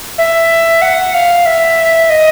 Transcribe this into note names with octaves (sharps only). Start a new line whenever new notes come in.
E5
F#5
F5
E5
D#5